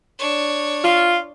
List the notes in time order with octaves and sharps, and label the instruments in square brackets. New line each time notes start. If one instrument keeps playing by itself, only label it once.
[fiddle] D4 C#5
[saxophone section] F4